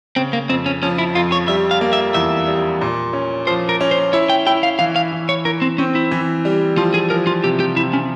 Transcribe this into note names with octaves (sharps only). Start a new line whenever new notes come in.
C#3 C4
A#3
F2 C4
C#4
F3 C#4
E4
F2 F4
C#5
G3 E5
F5
A#3
E5
E2 E5
G3
A#2
C#4
F3 C5
A#4
C#4
C5
E4 C#5
G5
E4 G5
F5
E3 F5
F5
E3
C#5
E3 A#4
C4
C4 C#4
E4
E3
G3
F3 F4
G#4
F3 A#4
F4
C3 G4
G4
C3 E4
C#4